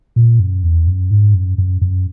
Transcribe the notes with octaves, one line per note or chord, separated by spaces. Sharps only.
A#2
F#2
E2
F#2
G#2
F#2
F#2
F#2